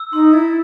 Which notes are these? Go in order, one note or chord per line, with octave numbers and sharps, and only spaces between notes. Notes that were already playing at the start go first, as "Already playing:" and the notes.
Already playing: E6
D#4 C6
E4 A6